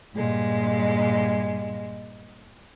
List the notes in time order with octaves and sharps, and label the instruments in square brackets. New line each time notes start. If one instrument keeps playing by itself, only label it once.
[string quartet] G2 A#2 G#3